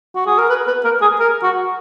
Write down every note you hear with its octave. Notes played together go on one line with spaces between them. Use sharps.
F#4
G#4
A#4
B4
B4
A#4
G#4
A#4
F#4